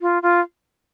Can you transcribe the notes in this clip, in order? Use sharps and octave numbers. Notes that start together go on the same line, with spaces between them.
F4
F4